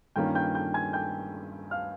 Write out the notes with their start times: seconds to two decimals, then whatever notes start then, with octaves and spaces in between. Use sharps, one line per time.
0.16 G2 D#3 A#3 C#4 F4 G5 G6
0.35 G5 G6
0.55 G5 G6
0.74 G#5 G#6
0.93 G5 G6
1.71 F5 F6